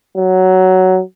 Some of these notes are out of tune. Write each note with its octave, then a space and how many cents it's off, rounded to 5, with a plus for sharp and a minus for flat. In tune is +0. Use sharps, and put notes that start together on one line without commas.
F#3 +10